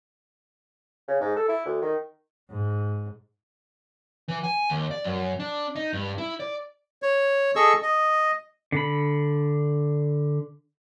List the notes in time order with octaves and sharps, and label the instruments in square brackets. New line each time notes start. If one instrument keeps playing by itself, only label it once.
[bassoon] C#3
G#2
A4
E4
D2
D#3
[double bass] G#2
[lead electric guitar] E3
G#5
D#2
D5
F#2
D4
D#4
G2
E4
D5
[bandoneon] C#5
G#4 A4 D#5 C#6 E6
D#5
[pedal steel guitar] D3 B5